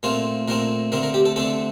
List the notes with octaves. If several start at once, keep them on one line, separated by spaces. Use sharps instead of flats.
A#2 A3 C4 F4
A#2 A3 C4 A#4
D3 A3 C4 A#4
A#4
G4
A4
D3 A3 C4 A4